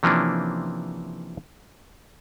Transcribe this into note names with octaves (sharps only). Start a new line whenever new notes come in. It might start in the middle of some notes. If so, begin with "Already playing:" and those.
C3 E3 F3 A#3 C#4 D4